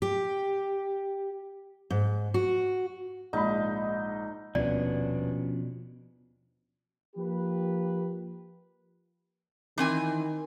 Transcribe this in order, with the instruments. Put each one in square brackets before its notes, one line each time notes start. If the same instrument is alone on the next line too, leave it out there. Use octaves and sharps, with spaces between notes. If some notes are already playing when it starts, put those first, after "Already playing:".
[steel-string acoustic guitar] G4
G#2
F#4
[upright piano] A#1 G#2 B5 [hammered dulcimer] D#4
[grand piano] D#1 B3 [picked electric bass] B2 [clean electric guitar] F3 C#4 D4 [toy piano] D5
[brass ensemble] F3 A#3 G4 B4
[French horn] D#3 [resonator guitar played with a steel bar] E3 C4 G#5